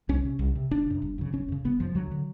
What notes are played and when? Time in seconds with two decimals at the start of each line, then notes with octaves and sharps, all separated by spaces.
0.09 C2 C#4
0.25 C3
0.39 C2
0.55 C3
0.71 G1 D4
0.86 F#2 C#3
1.02 G1
1.18 F#2 C#3
1.32 G1 C#4
1.48 F#2 C#3
1.64 G1 B3
1.80 F#2 C#3 F3
1.95 D2 F#3
2.11 D3